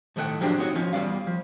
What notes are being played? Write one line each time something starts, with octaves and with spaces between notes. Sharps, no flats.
A2 D#3 A3 A#4 F#5 G5
F3 F#3 G#3 C4 D4 G4
C4 D#4 F#4 C#5
F3 C#4 F4
E2 E3 G3 D5 F5
F3